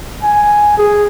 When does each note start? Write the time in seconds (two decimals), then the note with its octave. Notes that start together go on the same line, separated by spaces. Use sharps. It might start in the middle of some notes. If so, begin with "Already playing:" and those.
0.23 G#5
0.77 G#4